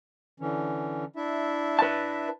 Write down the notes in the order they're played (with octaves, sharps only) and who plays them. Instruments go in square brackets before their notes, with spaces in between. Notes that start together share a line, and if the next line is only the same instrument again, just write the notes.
[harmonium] D3 E3 C#4
D4 E4 E5
[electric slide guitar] B4 A5